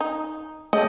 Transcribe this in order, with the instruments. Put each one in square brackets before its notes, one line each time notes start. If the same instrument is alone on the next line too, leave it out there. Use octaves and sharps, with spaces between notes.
[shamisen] D#4
[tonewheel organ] A3 [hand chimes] G#4 C#5 A5 [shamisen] D#5